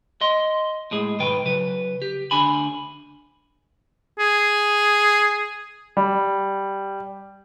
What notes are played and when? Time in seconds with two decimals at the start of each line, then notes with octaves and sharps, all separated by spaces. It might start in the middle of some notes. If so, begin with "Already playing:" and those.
0.21 D#5 C6
0.91 A2 G#3 G#4
1.19 B1 G#2 D#3 B4 G5
1.46 C#3 F#3 B4
2.02 G4
2.31 D2 D3 D4 G#5 B5
4.19 G#4
5.97 G3